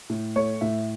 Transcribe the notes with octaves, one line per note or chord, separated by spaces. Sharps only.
A2
A3 C#5
A2 E5